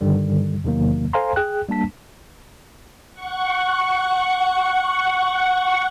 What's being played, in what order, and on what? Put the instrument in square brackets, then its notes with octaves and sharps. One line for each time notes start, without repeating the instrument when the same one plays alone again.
[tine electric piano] G2 D3 D#3 G3
E2 C3 D#3 F#3 A#3
A4 C5 F5 G#5 A#5 C6
G#4 G5 F#6
G3 A#3 D4 A5 B6
[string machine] F#5 C#6